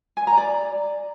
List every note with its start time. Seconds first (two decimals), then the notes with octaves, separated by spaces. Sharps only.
0.17 G#5
0.27 A#5
0.37 D5